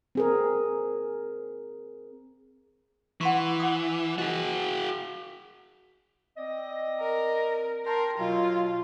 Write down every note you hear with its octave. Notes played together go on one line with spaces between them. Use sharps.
C4 G#4 A#4
E3 F#5 C6 C#6
F#5 D#6
F#4 G#4 D#5
C4 D5 D#5
A#4
A#4 G5 A5 C6
B2 F#3 F4